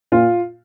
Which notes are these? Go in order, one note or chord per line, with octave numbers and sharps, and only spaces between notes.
A#2 F4